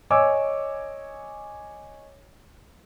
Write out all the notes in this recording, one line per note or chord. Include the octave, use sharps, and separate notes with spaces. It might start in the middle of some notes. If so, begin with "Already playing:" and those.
C#5 D#5 G#5 D6 E6